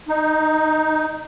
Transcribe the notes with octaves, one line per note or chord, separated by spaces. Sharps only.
D#4